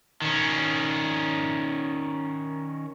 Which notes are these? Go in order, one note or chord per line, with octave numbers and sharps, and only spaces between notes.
D#3 C#4